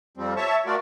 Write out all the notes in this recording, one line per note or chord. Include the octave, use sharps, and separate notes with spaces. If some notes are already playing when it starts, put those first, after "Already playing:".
F2 F3 G3 C4
C#5 E5 A5 C#6
A3 F4 F#4 A#4 D5